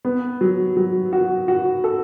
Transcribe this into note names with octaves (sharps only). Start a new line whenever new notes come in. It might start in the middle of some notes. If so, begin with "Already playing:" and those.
B3
F#3
F#3
F#4
F#4
A4